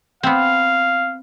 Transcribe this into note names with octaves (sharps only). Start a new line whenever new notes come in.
B3 C4 F5